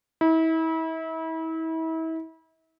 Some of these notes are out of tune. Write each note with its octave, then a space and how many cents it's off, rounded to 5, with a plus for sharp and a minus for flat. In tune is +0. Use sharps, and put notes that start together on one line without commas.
E4 -35